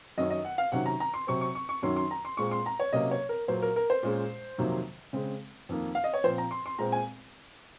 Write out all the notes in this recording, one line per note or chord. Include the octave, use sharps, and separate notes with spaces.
F#2 D#3 F#3 C#4 D#5
D#5
F#5
F5
C3 D#3 F#3 C#4 F#5
A#5
A#5
C6
C3 F#3 C4 C#6
C#6
C#6
C#6
F#2 D#3 F#3 C#4 C6
C6
A#5
C6
A#2 G#3 C4 C#6
C6
A#5
C#5
C3 F#3 A#3 C#4 D#5
C#5
A#4
A#2 F#3 A#3 C5
A#4
A#4
C5
A#2 G#3 C#4
F2 C3 D#3 F#3 A#3
C#3 G#3 C4
F2 D#3 A#3
F5
D#5
C#5
A#2 F3 C4 C5
A#5
C6
C6
A#2 G#3 C4 A#5
G#5